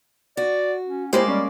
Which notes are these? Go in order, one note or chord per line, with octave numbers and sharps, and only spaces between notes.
F#4 D5
C#4
G#3 A#3 E4 G4 C5 D5
G3 C#4